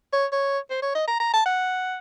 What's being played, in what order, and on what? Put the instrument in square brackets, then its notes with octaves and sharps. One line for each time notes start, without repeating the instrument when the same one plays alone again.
[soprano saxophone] C#5
C#5
C5
C#5
D#5
A#5
A#5
A5
F#5